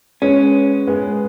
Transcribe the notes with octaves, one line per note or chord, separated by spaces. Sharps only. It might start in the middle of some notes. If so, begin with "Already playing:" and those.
G#3 B3 C#4 G#4
G#3 B3 G#4